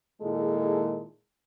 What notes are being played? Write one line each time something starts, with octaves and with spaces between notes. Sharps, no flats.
A#2 D#3 G#3 E4 G#4 A4